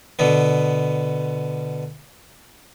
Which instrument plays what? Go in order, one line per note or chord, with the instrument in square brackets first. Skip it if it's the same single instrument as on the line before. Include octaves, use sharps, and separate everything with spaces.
[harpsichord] B2 D3 B3